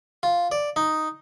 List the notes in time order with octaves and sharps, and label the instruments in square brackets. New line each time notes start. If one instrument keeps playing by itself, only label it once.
[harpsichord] F4
D5
D#4